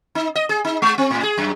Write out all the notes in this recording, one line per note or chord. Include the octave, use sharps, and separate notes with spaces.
D#4
D#5
G#4
D#4
G#3
C4
A2
G#4
F#2